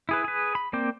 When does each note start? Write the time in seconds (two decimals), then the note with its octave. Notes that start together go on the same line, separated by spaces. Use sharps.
0.09 E4 G#4 B4
0.24 G#4 B4
0.55 B5
0.73 A#3 C4 D5 G5